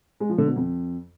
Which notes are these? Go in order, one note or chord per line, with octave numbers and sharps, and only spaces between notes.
G#3
F3
D3
B2
F2